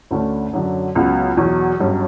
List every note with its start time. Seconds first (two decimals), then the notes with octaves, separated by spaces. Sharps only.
0.11 D2 D3 A3 C#4
0.53 F#2 D3 F#3
0.95 C#2 C#3 F#3 B3
1.37 E2 B2 F#3
1.79 G1 G2 F#3 C#4